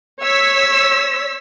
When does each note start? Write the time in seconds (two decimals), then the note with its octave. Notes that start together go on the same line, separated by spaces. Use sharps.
0.21 C#5 E6 B6